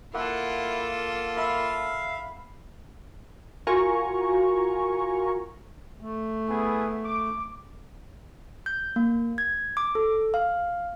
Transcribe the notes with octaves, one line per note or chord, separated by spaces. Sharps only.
A#3 E4 F4 A4 F#5
E5 F5 B5
F4 F#4 A#4 G#5 A#5 C#6
A3
B3 E4 G#4
D6
G6
A#3
G#6
D6
A4
F5